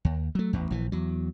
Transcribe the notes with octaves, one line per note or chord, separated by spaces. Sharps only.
D#2
F#3 A3
A1 E2
A#1 E3
E2 F#3